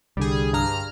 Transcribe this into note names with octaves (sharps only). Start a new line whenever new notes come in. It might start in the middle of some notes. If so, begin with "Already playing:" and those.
C2 D3 G3 G#4
G2 A#5 F6